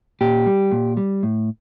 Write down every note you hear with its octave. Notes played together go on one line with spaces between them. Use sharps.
A#2 G4
G3
A#2
G3
A2